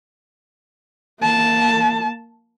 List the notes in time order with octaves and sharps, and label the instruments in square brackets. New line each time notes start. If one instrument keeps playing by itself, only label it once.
[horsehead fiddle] A#3 A5